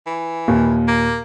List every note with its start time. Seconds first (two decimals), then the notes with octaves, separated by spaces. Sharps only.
0.06 E3
0.48 D#2 A#2
0.88 A#3